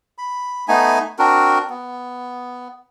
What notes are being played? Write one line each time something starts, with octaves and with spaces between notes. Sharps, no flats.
B5
A3 B3 D#4 G#5
C4 D4 F#4 A#4
B3